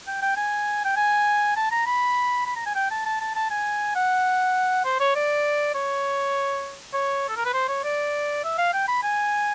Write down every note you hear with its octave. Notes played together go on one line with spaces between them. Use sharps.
G5
G5
G#5
G5
G#5
A5
A#5
B5
B5
A#5
G#5
G5
A5
A5
A5
A5
G#5
F#5
C5
C#5
D5
C#5
C#5
A4
A#4
B4
C5
C#5
D5
E5
F5
G5
B5
G#5